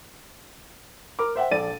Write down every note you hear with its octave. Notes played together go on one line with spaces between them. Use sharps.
A#4 D6
C5 E5 F#5 G5
A#1 A4 D5 A6 D#7